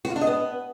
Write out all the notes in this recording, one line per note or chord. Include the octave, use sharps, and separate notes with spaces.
F#4
F4
D4
D#5
B3